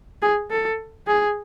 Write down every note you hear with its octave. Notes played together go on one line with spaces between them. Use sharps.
G#4
A4
G#4